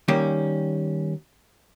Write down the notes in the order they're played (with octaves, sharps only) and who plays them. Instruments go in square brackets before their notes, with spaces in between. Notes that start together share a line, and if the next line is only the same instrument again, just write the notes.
[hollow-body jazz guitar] D#3 G3 A#3 C#4